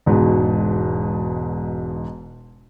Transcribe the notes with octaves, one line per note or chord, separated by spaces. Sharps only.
E1 G#2 B2